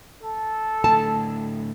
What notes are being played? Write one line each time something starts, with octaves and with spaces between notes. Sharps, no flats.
A4
A2 D3 A3 A5